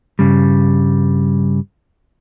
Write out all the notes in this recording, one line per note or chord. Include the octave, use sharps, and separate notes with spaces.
G2 C#3 G3